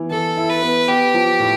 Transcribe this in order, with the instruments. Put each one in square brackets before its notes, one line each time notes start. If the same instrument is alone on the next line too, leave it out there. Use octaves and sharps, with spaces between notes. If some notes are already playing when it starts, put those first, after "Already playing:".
Already playing: [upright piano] E3 B3
[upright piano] E3 [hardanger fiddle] A4
[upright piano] E4
[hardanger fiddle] B4
[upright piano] B3
[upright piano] B3 [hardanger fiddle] G4
[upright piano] F3
A2